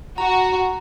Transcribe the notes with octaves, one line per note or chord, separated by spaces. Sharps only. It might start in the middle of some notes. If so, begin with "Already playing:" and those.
F#4 A#5